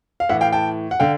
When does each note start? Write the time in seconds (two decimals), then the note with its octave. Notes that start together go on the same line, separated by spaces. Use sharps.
0.20 F5
0.29 A2 E3 E5 F#5
0.41 F5 G5
0.53 G5 A5
0.91 F#5
1.00 D3 F5 G5